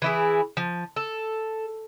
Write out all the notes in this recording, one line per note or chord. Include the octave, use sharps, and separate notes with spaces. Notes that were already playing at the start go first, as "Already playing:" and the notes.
E3 E4 G#4
F3
A4